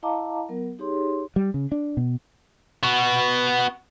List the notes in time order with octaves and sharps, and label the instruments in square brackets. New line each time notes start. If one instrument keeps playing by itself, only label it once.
[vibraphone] E4 D#5 F5 A5 A#5 D6
F#3 B3 A#4
D#4 G4 G#4 C#5 C6
[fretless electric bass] G3
C#3
D4
B2
[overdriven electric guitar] B3 F#4